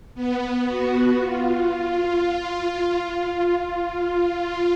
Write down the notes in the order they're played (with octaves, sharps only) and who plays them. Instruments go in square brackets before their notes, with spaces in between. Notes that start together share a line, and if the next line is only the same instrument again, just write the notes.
[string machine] B3
F#4
F4
F4